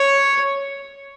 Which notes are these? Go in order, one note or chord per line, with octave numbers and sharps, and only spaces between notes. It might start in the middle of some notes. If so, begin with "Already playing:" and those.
Already playing: C#5